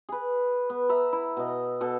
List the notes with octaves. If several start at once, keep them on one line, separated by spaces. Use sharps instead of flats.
G#4 B4
B3
E5 A#5 B5
E4
B2 D#5
B2 A4